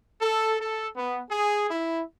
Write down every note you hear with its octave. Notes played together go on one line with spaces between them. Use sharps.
A4
A4
B3
G#4
E4